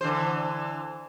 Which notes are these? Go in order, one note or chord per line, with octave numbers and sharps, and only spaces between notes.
D3 E3 C5